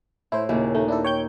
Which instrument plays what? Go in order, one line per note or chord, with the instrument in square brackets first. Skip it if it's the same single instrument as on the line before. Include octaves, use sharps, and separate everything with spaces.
[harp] A2 [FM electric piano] E4 C5
[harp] D#2 A#2 C#3 [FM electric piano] E4
[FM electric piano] A3 [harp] D#4
[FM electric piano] D4 E4 A4
C#5 G5 G6